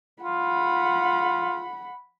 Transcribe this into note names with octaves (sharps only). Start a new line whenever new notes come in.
F4 F#5 B5